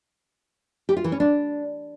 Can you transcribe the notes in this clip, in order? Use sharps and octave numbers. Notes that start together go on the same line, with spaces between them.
G4
F4
E3
C#4
D4